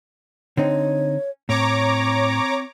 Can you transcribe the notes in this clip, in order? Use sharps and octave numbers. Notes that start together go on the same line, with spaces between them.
D3 C4 D#4 C#5
A2 C4 C#5 A#5 D6